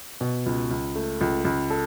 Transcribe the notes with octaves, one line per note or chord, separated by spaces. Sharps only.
B2
C#2
C#2
A3
C#2
C#2
A4